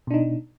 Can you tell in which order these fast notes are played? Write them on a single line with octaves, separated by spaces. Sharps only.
B2 D4 D#4